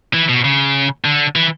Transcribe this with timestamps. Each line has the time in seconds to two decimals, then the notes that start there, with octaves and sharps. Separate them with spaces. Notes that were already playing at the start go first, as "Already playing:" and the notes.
0.14 E3
0.29 B2
0.44 C#3
1.04 D3
1.36 E3